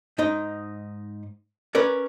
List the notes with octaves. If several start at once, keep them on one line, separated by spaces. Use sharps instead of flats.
G#2 D#4 D#5
C#4 A#4 B4 D5